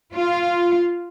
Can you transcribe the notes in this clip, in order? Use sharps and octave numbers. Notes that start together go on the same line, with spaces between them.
F4